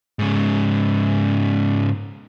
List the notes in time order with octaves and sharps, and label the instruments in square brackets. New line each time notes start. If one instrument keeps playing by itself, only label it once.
[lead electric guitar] G#2 C#3